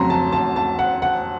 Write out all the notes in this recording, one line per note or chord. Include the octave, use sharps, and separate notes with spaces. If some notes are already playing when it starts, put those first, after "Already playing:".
Already playing: F2 C#3 F#3 A#5 C6
A5
A5
A5
F#5
F#5